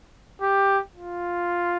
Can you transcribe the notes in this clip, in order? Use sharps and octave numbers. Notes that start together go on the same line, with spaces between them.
G4
F4